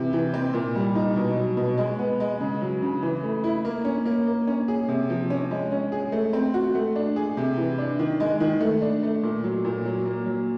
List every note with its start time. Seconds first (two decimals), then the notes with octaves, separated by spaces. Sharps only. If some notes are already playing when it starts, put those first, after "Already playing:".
Already playing: C3 E3
0.13 E3
0.34 C4
0.54 A#2
0.75 G3
0.95 D#4
1.16 B2
1.36 F#3
1.57 B2
1.78 G#3
1.99 B3
2.20 G#3
2.41 C#3
2.62 F#3
2.82 C#3
3.03 E3
3.24 A3
3.44 E4
3.65 A#3
3.85 C#4
4.05 A#3
4.27 A#3
4.47 C#4
4.68 G#4
4.89 C3
5.10 F3
5.30 C#4
5.51 G#3
5.72 C#4
5.92 G#4
6.12 A3
6.33 C4
6.54 F#4
6.75 A3
6.95 D4
7.16 G#4
7.37 C3
7.57 E3
7.78 D4
7.99 D#3
8.20 G#3
8.40 D#3
8.61 A3
8.82 D4
9.03 A3
9.23 A#2
9.44 F#3
9.65 A#2
9.85 F#3
10.06 A#3
10.26 F#3